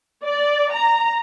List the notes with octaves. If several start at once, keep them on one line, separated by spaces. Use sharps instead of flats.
D5
A#5